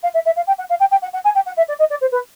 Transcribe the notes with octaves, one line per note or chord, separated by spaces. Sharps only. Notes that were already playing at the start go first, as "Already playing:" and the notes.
F5
E5
E5
F5
G5
F#5
F5
G5
G5
F#5
F#5
G#5
G5
F#5
E5
D5
D#5
D5
C5
B4